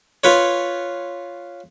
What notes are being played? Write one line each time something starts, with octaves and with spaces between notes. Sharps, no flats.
F4 B4 C#5